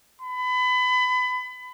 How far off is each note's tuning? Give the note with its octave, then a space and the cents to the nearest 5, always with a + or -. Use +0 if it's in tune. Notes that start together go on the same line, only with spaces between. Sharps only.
B5 +30